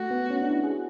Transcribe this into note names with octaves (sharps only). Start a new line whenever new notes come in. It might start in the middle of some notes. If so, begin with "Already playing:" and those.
Already playing: A3 F#4
B3
C#4
D4
E4
G#4
F#4